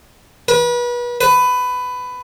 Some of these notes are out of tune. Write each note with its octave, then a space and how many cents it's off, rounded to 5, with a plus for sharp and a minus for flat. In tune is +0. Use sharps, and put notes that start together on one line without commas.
B4 -35
B4 +15